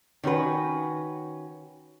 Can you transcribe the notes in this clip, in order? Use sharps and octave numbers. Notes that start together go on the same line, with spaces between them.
D#3 C#4 F#4 B4